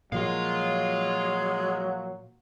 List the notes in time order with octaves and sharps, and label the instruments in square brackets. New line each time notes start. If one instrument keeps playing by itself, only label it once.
[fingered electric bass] A#2 F3 [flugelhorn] F#3 [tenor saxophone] G#3 [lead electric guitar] F5 C6